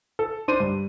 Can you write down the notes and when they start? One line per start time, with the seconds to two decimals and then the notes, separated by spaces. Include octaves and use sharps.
0.19 A4
0.48 D4 C5 D#7
0.60 G2